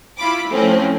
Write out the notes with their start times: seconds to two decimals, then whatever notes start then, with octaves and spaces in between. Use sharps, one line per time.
0.18 E4 F4 B5 D6
0.50 A2 F3 C4 C#4